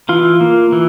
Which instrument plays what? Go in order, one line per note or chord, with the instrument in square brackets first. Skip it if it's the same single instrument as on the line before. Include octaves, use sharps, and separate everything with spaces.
[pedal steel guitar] E3 F4
A#3
E3